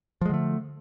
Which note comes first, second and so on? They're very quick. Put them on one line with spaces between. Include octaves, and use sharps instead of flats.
F3 G#3 D3 A3